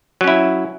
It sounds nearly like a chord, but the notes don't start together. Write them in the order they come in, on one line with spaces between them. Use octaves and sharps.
F#3 C#4 E4